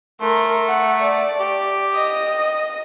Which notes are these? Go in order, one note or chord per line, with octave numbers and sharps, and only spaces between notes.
A3 A#4 C6
F#5
D5
G4
D#5 D#6